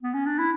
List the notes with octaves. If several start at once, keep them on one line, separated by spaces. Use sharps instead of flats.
B3
C#4
D4
E4